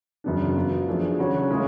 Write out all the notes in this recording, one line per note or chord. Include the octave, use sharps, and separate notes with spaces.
F#2 C#3 F#3 B3 D4
F#3 B3 F4
F3 A3 D4 G#4
C#3 F#3 C#4 F#4 C#5
A2 G#3 C#4 F4 G#4